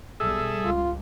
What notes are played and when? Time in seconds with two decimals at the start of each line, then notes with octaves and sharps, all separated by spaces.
0.20 B1 G3 G#4 A4 E5
0.65 C#2 F4